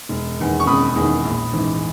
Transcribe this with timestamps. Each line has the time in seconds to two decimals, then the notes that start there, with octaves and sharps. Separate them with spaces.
0.09 E1
0.38 E2 D#3
0.60 C#6
0.67 E1 B5 D#6
0.96 E2 D#3
1.24 A#1
1.53 G#2 E3